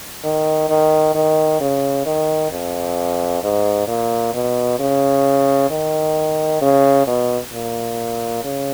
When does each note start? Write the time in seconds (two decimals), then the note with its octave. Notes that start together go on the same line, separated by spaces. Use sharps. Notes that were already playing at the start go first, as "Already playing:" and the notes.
0.24 D#3
0.69 D#3
1.15 D#3
1.60 C#3
2.06 D#3
2.51 F2
3.43 G#2
3.88 A#2
4.34 B2
4.79 C#3
5.70 D#3
6.61 C#3
7.07 B2
7.52 A#2
8.44 C#3